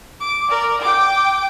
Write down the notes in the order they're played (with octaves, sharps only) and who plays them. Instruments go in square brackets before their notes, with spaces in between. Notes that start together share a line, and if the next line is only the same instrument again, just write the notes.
[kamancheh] D6
A#4 D5
G5 D6